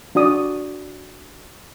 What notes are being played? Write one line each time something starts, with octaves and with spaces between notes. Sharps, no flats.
D4 F#4 D5 D#6